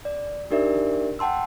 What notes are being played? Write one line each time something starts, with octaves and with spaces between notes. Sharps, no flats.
D5
D4 D#4 G4 A#4 D5 E5
F#5 G5 A5 C6 E6